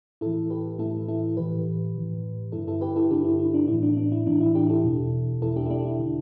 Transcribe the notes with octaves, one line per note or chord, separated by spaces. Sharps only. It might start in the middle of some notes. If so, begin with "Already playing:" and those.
A2 E3 E4 A4
G4 B4
A2 E3 E4 A4
E4 A4
A2 E3 G4 B4
A2 E3
G2 D3 E4 A4
E4 A4
G4 B4
E4 A4
G2 D3 D4 G4
E4
E4
D4
A2 E3 E4
D4
D4
E4
A2 E3 D4
E4
D4 G4
E4 A4
E2 B2
E2 B2 E4 A4
D4 G4
E4
D4 G4
E4
D3